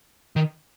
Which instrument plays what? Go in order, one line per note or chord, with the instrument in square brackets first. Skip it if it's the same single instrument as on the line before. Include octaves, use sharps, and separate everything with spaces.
[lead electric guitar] D#3